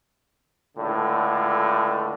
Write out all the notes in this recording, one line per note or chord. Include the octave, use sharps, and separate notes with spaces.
C#2 A2 D3